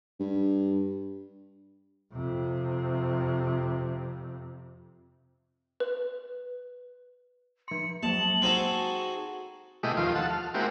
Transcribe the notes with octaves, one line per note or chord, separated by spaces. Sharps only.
G2
F2 C3
B4
F3 C6 C#7
F#3 G#3 A#3 A5 F#7
C4 D#4 F#4 G#4 A4 G7
B2 G#3 A3 E4 G4 D#5
D#2 F3 F4
A4 F#5 A5
F6
G#3 A#3 C4 E4 F#4 G4